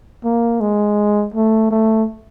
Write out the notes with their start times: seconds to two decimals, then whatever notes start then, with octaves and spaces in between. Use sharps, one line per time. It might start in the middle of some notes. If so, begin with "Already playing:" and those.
0.24 A#3
0.60 G#3
1.34 A3
1.71 A3